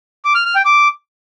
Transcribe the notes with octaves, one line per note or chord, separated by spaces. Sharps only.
D6
F6
F6
G5
D6